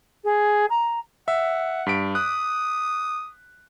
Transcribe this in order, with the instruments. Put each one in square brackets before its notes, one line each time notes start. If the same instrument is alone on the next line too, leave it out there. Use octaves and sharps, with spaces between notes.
[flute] G#4
A#5
[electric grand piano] E5 [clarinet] F#5
[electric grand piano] G2 B6 D7
[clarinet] D#6 [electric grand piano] F#6